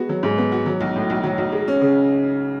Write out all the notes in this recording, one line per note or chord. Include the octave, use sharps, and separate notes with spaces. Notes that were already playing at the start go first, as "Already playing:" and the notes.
Already playing: G#3 B3 F#4
F#3
G#2
B3
F#4
F#3
B1
A2
B1
F#3
B1
G#3
C#4
C#3